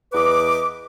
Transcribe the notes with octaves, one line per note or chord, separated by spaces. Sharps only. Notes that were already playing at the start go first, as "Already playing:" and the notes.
E2 B4 D#5 D6